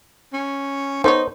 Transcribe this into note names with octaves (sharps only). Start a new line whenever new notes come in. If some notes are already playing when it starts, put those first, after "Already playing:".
C#4
D#3 B3 D#4 C5 C#5